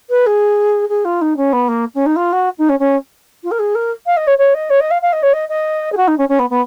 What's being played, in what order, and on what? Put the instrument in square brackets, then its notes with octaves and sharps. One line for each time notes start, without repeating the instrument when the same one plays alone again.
[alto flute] B4
G#4
G#4
F4
D#4
C#4
B3
A#3
C#4
D#4
F4
F#4
D#4
C#4
C#4
F4
A#4
G#4
A#4
F5
D#5
C#5
C#5
D#5
C#5
D#5
F5
F5
D#5
C#5
D#5
D#5
G#4
F#4
D#4
C#4
C#4
B3
B3